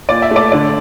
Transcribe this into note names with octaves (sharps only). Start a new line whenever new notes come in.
A#2 D5
E5
A3 D5
D3 D5